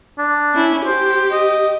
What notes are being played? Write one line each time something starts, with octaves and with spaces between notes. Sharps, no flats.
D4
C#4 E4
G4 C5
D#5